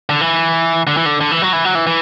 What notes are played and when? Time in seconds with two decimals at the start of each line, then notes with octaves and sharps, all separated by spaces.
0.09 D3
0.21 E3
0.87 D3
0.97 E3
1.06 D3
1.21 D3
1.31 E3
1.42 F#3
1.53 E3
1.65 F#3
1.75 E3
1.87 E3